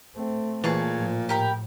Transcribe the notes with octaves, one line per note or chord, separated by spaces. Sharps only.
A3 C4
A#2 E3 G#4 C#5 A5
A2 F3
A2 G4 A#4 B5